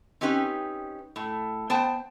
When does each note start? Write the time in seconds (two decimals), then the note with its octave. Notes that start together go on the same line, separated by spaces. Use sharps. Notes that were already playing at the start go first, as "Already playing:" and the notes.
0.21 C4 C#4 D#4 G4 B4
1.16 A2
1.70 B3 C5 G5 A5